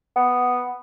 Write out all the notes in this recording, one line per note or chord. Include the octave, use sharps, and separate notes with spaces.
B3